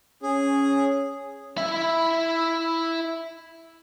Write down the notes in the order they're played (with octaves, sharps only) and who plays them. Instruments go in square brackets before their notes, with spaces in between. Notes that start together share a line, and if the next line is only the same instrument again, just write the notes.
[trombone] C#4 [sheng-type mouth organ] G#4
[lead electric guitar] E4 E5